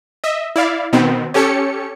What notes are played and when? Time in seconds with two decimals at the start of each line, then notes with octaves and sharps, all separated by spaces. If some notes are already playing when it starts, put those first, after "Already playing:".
0.24 D#5 E5
0.56 E4 D5 F5
0.93 B2 D#3 B3 C4
1.34 C#4 G4 A4 C#5 C#7